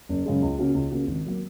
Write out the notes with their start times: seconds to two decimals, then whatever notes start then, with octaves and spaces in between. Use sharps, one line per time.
0.09 F#1
0.26 F#2 C#3 G#3
0.42 C#2
0.58 C#3 A#3 C#4 F#4
0.75 C#2
0.91 C#3 A#3 C#4 F#4
1.07 G#1
1.26 F#3 A#3